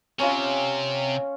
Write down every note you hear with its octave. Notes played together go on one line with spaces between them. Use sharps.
C3 C#4 F4